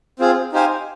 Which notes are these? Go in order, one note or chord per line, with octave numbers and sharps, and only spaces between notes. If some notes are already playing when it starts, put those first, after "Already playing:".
C4 F4 G#4
D#4 G4 C5 F5 G#5